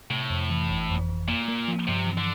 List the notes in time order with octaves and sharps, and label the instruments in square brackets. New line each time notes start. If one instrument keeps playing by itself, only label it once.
[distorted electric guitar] A2 [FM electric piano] C3
[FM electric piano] F2
E3
G1
F2
F2
[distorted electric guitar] A#2 [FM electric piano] A#3
[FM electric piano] A#3
F3
[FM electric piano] G2 [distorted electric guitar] C3
[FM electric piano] E3
[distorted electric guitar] D3